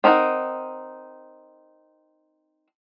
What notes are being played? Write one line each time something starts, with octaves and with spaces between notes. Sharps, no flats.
C4 D#4 A#4 C#5 F#5